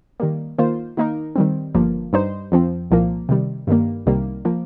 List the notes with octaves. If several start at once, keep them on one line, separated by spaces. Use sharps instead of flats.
D#3 G3 A#3
D#3 A#3 F4 C5
D#3 A#3 D#4 A#4
D#3 G3 C4
G1 G2 F3 A#3
G2 G3 D#4 C5
F2 F3 C4
C2 A#2 F3 A#3
C3 D#3 G3
G2 D#3 G3 A#3
C2 C3 D#3 G3 A#3
F3 A#3